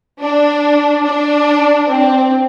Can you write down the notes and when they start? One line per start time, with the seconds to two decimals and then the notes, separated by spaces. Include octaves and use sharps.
0.20 D4
1.04 D4
1.87 C4